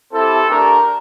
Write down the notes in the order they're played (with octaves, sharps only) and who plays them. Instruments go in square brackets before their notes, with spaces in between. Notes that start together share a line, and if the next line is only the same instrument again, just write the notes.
[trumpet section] C4 E4 G4 A4
A3 D4 G4 A#4